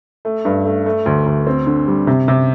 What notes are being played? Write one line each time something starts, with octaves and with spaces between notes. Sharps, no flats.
A3
G2
A3
A3
D2
D2
C4
D3
G3
C3
C3